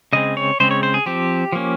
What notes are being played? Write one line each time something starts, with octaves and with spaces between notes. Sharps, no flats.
C#3 G#3 C4 D#5
C#5
C#3 G#3 C4 C5
C#5
C5
G#4
F3 C4 G4
F3 A#3 C#4